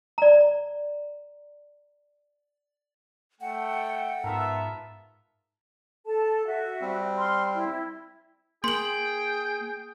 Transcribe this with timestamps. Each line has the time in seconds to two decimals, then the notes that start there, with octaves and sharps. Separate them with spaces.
0.18 D5 A#5
3.41 A3 F#5 G5
4.24 G#2 B3 F4 A#4 E5 A5 A#5
6.06 A4 A5
6.47 F#4 E5
6.81 G3 C4
7.17 C6 F6
7.55 E4
8.64 A#3 G#4 G5 C6 F#7